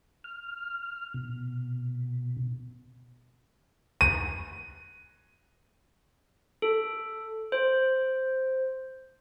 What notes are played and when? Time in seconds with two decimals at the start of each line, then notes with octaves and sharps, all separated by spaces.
0.24 F6
1.14 B2
4.01 D#7
6.62 A4
7.52 C5